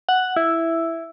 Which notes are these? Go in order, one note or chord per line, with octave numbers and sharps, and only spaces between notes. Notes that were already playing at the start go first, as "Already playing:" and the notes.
F#5
E4